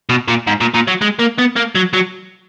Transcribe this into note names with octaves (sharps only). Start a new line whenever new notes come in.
B2
A#2
G#2
A#2
A#2
F#3
G#3
A#3
B3
A#3
F#3
F#3